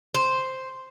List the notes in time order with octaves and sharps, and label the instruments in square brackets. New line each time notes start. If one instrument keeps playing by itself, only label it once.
[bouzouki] C5